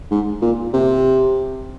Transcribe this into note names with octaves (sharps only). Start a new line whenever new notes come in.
G#2
A#2
C3